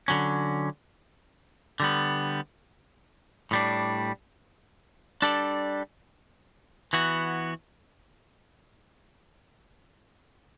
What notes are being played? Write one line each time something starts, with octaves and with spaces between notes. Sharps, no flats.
D3 F#3 C#4
D3 G3 B3
A2 G3 D4
G3 D4 A4 D5
E3 B3 F#4